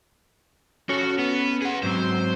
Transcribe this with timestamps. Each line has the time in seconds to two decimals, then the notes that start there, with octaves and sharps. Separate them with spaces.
0.89 C#4 F#4 A4 C#5
1.18 B3
1.62 G#4 F#5
1.83 G#2 F#3 C4 C5